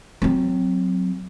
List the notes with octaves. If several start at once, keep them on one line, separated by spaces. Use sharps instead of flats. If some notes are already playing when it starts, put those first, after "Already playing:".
F#3 C4